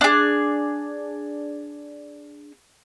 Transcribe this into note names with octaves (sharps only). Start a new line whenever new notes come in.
D4 G#4